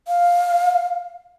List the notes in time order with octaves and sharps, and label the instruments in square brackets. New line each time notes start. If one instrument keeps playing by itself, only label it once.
[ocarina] F5